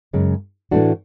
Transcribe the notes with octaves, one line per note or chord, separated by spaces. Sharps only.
F#2 C#3 G#3 C#4
A2 E3 A3 D4 F#4